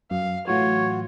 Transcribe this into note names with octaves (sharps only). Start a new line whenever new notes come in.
F#2 F5
A2 E3 F#3 F4 F#4 C#5